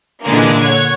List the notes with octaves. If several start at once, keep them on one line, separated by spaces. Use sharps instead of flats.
A#2 D3 E3 G#3 A#3
C#5 F#5 G#6